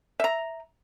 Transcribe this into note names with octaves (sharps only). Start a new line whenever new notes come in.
E5 A#5